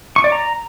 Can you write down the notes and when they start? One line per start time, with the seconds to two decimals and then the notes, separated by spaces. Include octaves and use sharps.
0.16 C#6
0.24 D5
0.32 A#5